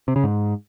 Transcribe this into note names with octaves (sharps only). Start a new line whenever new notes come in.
C3
C#3
G#2